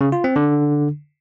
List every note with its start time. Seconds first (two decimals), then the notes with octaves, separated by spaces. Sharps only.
0.01 C#3
0.12 F4
0.24 C4
0.36 D3